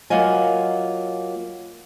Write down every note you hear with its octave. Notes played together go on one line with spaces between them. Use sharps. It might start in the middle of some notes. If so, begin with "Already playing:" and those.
F#3 A#3 F4 D#5 G#5